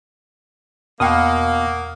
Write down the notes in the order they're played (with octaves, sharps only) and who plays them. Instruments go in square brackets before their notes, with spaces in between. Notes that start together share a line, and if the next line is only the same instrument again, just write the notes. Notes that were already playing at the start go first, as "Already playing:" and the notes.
[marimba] E2 G5 [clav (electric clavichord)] B2 [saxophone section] A#3 [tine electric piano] F#5 C#6 D#6